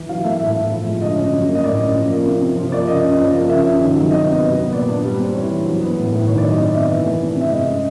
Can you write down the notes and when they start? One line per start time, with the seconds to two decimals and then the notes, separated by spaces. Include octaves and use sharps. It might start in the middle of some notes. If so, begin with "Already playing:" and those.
Already playing: E3
0.09 F#3 F5
0.24 A3 E5
0.40 A2 E5
0.55 A2
0.71 F3
0.86 G#3
1.02 D3 D#5
1.17 C#4
1.33 F#3
1.48 A#3
1.55 D#5
1.64 A2 D5
1.79 C#4
1.95 F3
2.10 A#3
2.26 C3
2.41 C3
2.56 F3
2.72 A#3 D5
2.87 C#3 D#5
3.03 C#4
3.19 F3
3.34 A#3
3.49 C#3 E5
3.65 C#4
3.80 D#3
3.95 F#3
4.11 C3 D#5
4.27 B3
4.42 F#3
4.58 B3
4.73 A#2 D5
4.88 D4
5.03 G3
5.19 C4
5.35 E3 C#5
5.50 E3
5.66 F#3
5.81 B3
5.97 A2
6.12 A2
6.27 D#3 C#5
6.38 D5
6.43 F#3
6.48 D#5
6.58 C3 D5
6.74 B3 E5
6.90 E3
7.05 A3
7.21 C3
7.36 C3
7.41 E5
7.51 G#3 D#5
7.67 C#4